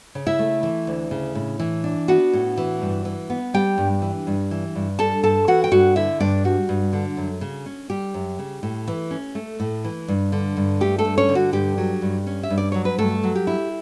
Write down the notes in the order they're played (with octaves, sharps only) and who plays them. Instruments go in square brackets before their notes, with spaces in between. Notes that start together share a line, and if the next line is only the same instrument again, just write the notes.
[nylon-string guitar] C#3
E4 E5
A3
E3
D2
C#3
A2
E3
D4
B3 F#4 F#5
A2
E3
G2
E3
B3
G3 G4 G5
G2
E3
G2
E3
G2
G3 A4 A5
G2 A4 A5
E3 F#4 F#5
G5
G2 F#4 F#5
D3 E4 E5
G2 D4 D5
G3 F#4
G2
D3
F#2
C#3
C#4
G3 G4
F#2
C#3
A2
E3
C#4
A3
A2
E3
G2
D3
G2
A3 G4
A3 A4
G2
C#4 C#5
D3
F#4
G2 G4
F#3
G2
C#4
E5
G2
D5
F#3 C#5
B4
G2 A3 A4
F#3
G4
E4